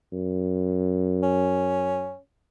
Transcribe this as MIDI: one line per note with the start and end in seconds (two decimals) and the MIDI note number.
0.12 2.13 42
1.23 2.18 61